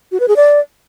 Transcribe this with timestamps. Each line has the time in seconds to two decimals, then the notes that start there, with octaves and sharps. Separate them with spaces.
0.12 F#4
0.20 B4
0.28 G#4
0.36 D5